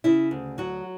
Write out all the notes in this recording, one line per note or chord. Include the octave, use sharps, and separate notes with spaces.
C#3 E4
D2
F#3 F#4